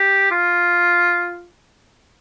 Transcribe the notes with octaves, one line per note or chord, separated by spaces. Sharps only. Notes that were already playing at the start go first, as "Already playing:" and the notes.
Already playing: G4
F4